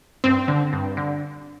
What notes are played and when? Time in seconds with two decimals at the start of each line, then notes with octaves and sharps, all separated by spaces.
0.24 G2 C4
0.48 D3
0.73 G2
0.97 D3